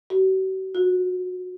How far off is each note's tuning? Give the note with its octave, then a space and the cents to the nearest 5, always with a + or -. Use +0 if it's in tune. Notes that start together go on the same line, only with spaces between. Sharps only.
F#4 +45
F#4 -25